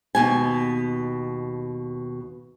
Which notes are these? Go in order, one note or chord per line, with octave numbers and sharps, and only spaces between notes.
D#2 B2 G#5